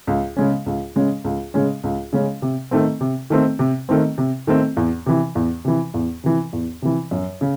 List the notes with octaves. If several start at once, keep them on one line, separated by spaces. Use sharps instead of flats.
C#2
C#3 G#3 C#4
C#2
C#3 G#3 C#4
C#2
C#3 G#3 C#4
C#2
C#3 G#3 C#4
C3
D#3 A3 C4
C3
D#3 A3 C4
C3
D#3 A3 C4
C3
D#3 A3 C4
E2
C3 E3
E2
C3 E3
E2
C3 E3
E2
C3 E3
F#2
C#3